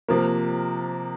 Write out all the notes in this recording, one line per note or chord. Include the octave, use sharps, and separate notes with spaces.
C3 F3 A#3